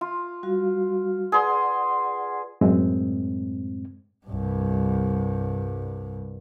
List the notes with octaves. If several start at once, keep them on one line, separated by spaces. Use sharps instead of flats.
F4
G3 F#4 F5
G#4 B4 D5 F#5 C6
F#2 A2 G#3 C4
C2 G2